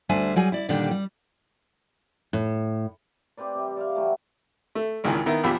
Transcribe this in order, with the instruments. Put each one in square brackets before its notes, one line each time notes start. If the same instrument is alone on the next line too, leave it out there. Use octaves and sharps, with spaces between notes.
[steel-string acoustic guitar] D2 G3 D4 C5 E5 G#5
F#3 G3 G#4 G#5
E4 D5
A#2 D3 D#3 G3 D4 G4
G3
A2
[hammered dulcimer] C4 G4 B4 D5
C3 G3
D5 E5 F5
E3 F#3 A3
[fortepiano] A3
G#1 C#2 A#2 D#3 E3
D#3 B3 E4 A#4
A#1 E2 F3 G4 B5 E6